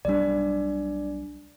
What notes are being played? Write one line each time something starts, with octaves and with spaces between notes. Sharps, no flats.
B1 G3 D4 D5